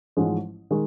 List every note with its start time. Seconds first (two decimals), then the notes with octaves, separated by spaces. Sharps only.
0.17 A1 G#2 F3 G#3
0.71 D#3 G#3